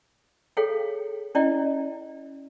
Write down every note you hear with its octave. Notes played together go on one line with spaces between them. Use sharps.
G#4 A4 C#5 F5 G5
C#4 E4 D5 D#5 G5